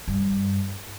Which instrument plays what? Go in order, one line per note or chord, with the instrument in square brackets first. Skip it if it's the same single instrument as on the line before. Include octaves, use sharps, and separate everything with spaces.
[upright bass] G2